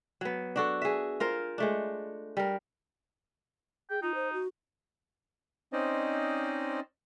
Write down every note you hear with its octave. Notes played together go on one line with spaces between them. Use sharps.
F#3 B3
D4 F#4 A4
G#4 E5
F4 A#4 C5
G#3 A3 D4
G3 A#4
G#4 G5
D#4 F4
C5
F#4
C4 C#4 D#4 C5 D5 D#5